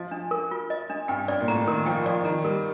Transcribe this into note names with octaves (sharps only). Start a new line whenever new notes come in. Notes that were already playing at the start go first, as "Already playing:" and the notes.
Already playing: F3 D#5
D4
A#4
F4
D#5
D4
G2 G5
G2 D5
A#2
A2 A#5
D#3 A#4
F3 G5
F3 D5
D#3 A#5
G3 A#4